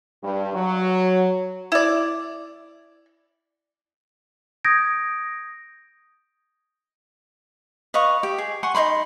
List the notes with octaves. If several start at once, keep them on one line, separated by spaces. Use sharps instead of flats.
G2
F#3
E4 D5
D#6 G6 G#6 A#6 D7
B4 D#5 F5 C#6
G4
G#4
F#5 G#5 C6 C#6
D#4 C#5 B5 C6